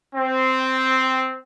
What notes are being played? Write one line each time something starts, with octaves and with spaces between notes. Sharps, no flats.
C4